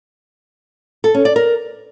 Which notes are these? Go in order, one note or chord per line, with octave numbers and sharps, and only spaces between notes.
A4
C#4
D5
A#4